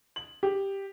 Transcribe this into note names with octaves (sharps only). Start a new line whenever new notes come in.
F#7
G4